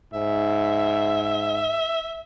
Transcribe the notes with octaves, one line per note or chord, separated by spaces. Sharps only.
G#2 E5